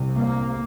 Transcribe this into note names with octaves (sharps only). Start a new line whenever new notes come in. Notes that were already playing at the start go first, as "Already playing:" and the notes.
Already playing: C2 C3
A#3